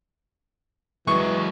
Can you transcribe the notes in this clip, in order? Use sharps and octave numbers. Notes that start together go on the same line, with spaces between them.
E3 F#3 G#3 C#6